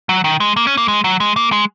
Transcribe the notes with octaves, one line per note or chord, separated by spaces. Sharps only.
F#3
D#3
G#3
A#3
C#4
A#3
G#3
F#3
G#3
A#3
G#3